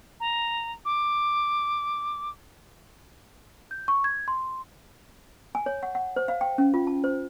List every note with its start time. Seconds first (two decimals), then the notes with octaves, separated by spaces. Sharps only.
0.20 A#5
0.85 D6
3.71 G6
3.88 C#6
4.04 G#6
4.28 C6
5.55 G#5
5.66 C#5
5.83 F#5
5.95 F#5
6.16 C5
6.28 F5
6.41 G5
6.58 C#4
6.74 F4
6.87 A5
7.04 C5